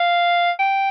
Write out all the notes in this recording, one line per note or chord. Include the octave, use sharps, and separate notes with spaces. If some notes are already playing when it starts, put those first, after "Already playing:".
Already playing: F5
G5